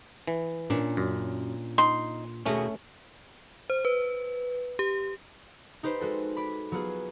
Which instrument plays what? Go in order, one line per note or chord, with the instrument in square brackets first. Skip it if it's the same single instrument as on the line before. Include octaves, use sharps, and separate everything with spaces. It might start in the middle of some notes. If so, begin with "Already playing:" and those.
[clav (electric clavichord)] E3
[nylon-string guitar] A#2 C#4 D4
[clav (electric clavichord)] F#2
[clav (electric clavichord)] D#4 [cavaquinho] C6
[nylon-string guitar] D#2 B2 G#4 [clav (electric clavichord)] A3 C#4
[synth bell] C5
B4
G4
[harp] D#4 G4 B4 C5
G#3 F#4 A4
D5 B5
F#3 B3 F4 G#4